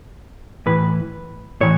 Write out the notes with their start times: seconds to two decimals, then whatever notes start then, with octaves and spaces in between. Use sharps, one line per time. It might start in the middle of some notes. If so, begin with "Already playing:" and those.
0.66 A2 E3 B4
1.61 A2 E3 C#5